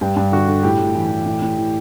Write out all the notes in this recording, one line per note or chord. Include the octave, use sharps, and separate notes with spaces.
G2 G4
G2
D3 F#4
D3
A2 G4
A2
E3
E3
A2
A2
E3